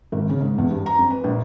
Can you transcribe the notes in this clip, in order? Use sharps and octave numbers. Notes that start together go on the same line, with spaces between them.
G#1
C#3
G#2
E2
G2
A#5
F2
B4
A#1